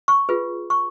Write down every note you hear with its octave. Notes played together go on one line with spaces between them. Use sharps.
C#6
F4 G#4 B4
C#6